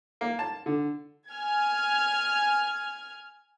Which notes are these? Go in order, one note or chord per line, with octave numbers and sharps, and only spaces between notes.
A#3
A5
D3
G#5 F6 G#6